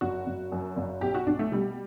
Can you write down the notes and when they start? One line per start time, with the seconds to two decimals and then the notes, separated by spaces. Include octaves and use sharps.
0.01 F#1 F#4
0.26 F#1
0.52 F#2
0.77 F#1
1.01 B1 G4
1.15 F#4
1.26 B1 D4
1.39 A3
1.52 B2 G3